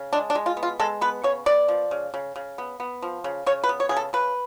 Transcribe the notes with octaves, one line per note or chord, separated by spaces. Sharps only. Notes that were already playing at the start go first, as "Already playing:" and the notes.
Already playing: C#3
G#3 D4
D4
G#3
F4
B3
F4
G#3 A4
B3 B4
C#3 C#5
B3 D5
F3
C#3
C#3
C#3
B3
B3
F3
C#3
C#3 C#5
B4
B3
C#5
C#3 G#4
A4
C#3 B4